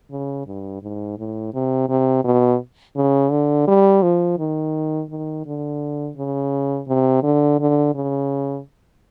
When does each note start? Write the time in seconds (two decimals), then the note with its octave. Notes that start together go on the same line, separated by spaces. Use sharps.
0.10 C#3
0.46 G2
0.82 G#2
1.18 A2
1.54 C3
1.89 C3
2.24 B2
2.96 C#3
3.31 D3
3.67 G3
4.02 F3
4.39 D#3
5.10 D#3
5.46 D3
6.17 C#3
6.87 C3
7.23 D3
7.59 D3
7.95 C#3